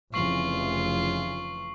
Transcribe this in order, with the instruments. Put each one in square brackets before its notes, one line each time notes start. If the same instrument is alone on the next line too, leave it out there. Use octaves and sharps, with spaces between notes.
[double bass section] F1 C#3 E3 [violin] F4 [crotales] C#6 C7 F#7